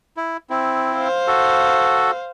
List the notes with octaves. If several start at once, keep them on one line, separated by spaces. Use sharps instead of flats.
E4
C4 E4
C5 F5
F#4 A4